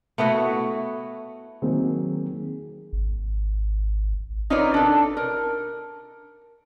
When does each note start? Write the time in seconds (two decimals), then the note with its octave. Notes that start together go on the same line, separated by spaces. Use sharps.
0.18 A3 B3 E4 F#4
1.62 D#3 F#3 A#3 C4 G#4
2.93 G#1
4.50 D#4 F4 A#4 B4 C#5 D5
4.74 D4 A4
5.17 A#4